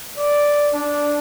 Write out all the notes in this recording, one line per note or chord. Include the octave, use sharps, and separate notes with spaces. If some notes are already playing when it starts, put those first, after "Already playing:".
D5
D4